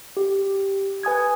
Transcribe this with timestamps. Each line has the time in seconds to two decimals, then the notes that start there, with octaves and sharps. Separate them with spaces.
0.17 G4
1.03 B4 G#5 D#6 G#6